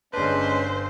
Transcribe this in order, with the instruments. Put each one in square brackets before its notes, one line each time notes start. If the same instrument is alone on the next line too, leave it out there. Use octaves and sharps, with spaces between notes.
[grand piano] G1 D4 [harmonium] G#3 C#4 [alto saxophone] B4 [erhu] C5